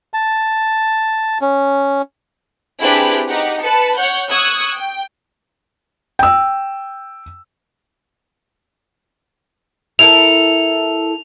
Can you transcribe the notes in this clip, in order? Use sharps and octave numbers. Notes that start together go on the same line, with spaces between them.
A5
C#4
C4 D4 E4 G4 G#4 B4
D#4 G4 F#5
B4 A5 C#7
C#5 F#5 G6
C#6 D#6 E6 F#6 G#6
G5
G5 E6
E4 A4 A#4 F7